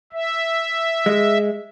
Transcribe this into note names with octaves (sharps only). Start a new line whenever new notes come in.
E5
G#3